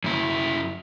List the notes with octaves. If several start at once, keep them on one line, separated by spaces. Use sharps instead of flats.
F#2 E4